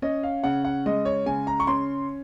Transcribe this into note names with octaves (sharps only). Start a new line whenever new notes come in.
C#4 D#5
F5
C#3 F#5
F#5
G#3 D#5
C#5
C#3 G#5
A#5
C#6
C#4 C6